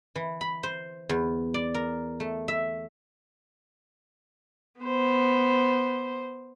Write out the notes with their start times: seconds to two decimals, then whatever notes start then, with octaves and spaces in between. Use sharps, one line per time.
0.15 E3
0.41 B5
0.63 C5
1.09 E2
1.54 D5
1.74 A#4
2.20 A3
2.48 E5
4.81 B3 C5